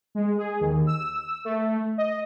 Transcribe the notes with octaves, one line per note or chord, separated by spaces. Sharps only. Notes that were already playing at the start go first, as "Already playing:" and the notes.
G#3
G#4
D#2
E6
A3
D#5